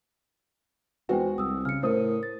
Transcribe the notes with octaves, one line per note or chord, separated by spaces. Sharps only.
E2 G#3 F#4 B4 C5 G5
C2 D#6 E6
C#3 F6 C#7
A2 E4 A#4 C5 D#6
A6